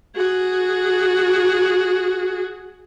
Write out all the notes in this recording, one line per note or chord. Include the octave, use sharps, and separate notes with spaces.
F#4 G#4